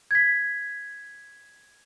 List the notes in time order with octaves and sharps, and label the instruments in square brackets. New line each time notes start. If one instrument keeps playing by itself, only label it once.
[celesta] G#6 B6